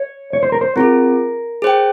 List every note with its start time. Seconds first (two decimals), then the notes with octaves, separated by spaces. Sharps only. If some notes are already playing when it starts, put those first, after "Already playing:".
Already playing: C#5
0.33 C#5
0.43 C5
0.52 A#4
0.61 C5
0.76 C4 F4 G#4 A#4
1.62 G#4 C5 G5